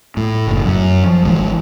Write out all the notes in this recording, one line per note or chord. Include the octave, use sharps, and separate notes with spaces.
A2
F#1
F#2
F3
G#1 G#2 D#3 E3